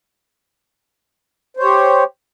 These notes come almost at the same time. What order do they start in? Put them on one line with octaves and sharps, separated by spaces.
C5 C#5 G4